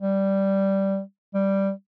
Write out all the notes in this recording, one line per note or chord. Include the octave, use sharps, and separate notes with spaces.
G3
G3